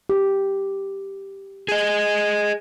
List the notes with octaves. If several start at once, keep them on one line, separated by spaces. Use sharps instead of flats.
G4
G#4 D#5